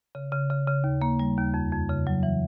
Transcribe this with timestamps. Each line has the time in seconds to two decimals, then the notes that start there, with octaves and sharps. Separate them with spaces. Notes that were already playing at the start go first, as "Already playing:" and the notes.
0.15 C#3
0.32 C#3
0.50 C#3
0.67 C#3
0.84 D#2
1.02 A#3
1.19 G3
1.37 D#2
1.54 F2
1.72 F2
1.89 C#3
2.07 F#3
2.23 E3